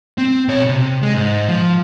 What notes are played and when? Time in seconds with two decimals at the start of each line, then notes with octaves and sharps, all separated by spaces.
0.18 C4
0.48 B2 C#5
0.69 C3
1.03 G#3
1.14 G#2
1.49 F3